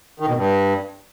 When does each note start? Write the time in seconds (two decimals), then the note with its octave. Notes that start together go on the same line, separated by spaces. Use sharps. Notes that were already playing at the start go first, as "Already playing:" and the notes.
0.20 D#3
0.28 B2
0.37 G2